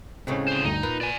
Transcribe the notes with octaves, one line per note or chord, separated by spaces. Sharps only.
A2 C#3 G#3 C4 C#4
D3 C5
D2 G2 D#4
A#2 B4
D5 G#5